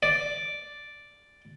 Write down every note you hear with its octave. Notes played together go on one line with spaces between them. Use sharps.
D5